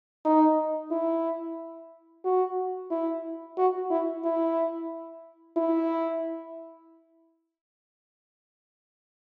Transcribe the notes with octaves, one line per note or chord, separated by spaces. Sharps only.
D#4
E4
F#4
E4
F#4
E4
E4
E4